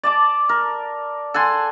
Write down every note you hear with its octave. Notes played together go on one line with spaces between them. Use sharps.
D5 A5 D6
A#4
A4 F#5 G#5 C6